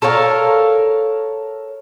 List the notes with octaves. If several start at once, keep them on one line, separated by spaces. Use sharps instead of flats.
A4 A#4 C#5 F5